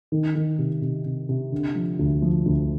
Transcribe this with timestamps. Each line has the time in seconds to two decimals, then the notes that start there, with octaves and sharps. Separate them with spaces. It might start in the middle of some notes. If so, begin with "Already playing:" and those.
0.12 D#3
0.35 D#3
0.59 C3
0.82 C3
1.05 C3
1.29 C3
1.52 D3
1.75 F3
1.99 D2
2.22 F3
2.46 D2